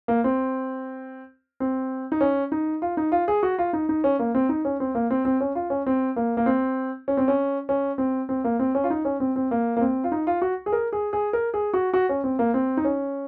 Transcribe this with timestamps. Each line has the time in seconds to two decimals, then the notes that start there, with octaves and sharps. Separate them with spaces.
0.08 A#3
0.24 C4
1.60 C4
2.12 D#4
2.21 C#4
2.52 D#4
2.82 F4
2.97 D#4
3.12 F4
3.28 G#4
3.43 F#4
3.59 F4
3.73 D#4
3.89 D#4
4.04 C#4
4.19 A#3
4.35 C4
4.49 D#4
4.65 C#4
4.80 C4
4.95 A#3
5.10 C4
5.25 C4
5.41 C#4
5.55 F4
5.70 C#4
5.86 C4
6.16 A#3
6.37 A#3
6.46 C4
7.08 C#4
7.17 C4
7.28 C#4
7.69 C#4
7.98 C4
8.29 C4
8.44 A#3
8.59 C4
8.75 C#4
8.84 F4
8.90 D#4
9.05 C#4
9.20 C4
9.36 C4
9.51 A#3
9.77 A#3
9.81 C4
10.04 F4
10.12 D#4
10.27 F4
10.42 F#4
10.66 G#4
10.72 A#4
10.92 G#4
11.13 G#4
11.33 A#4
11.54 G#4
11.74 F#4
11.94 F#4
12.09 C#4
12.24 C4
12.39 A#3
12.54 C4
12.77 D#4
12.85 C#4